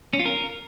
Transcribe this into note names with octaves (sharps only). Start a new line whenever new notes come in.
C#4
F4
A#4